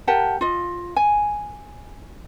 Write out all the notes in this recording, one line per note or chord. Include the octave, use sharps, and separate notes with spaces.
G4 A#4 F#5 A5
F4 D#5
G#5